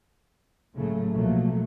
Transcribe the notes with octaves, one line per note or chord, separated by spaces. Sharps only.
A2 C#3 F#3 A3
B1 B2 F3 F#3 A3 A#3